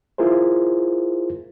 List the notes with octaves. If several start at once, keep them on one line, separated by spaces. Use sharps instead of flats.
E4 F4 G#4 A#4 C5